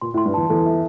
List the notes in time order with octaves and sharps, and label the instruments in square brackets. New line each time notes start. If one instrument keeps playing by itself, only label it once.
[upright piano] A#2 [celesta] C6
[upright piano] A2
[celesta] C6
[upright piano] G2
[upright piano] E2 [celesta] A5
[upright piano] E2 [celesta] A4
[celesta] E5